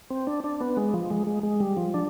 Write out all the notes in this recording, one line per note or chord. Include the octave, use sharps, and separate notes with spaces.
C4
D4
D4
B3
G#3
F3
G#3
G#3
G#3
G3
F3
D4